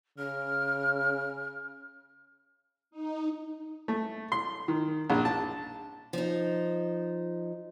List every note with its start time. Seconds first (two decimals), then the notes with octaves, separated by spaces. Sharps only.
0.18 C#3 F6
2.91 D#4
3.88 A3
4.32 C6
4.68 D#3
5.10 A#1
5.25 A5
6.13 F3 D#4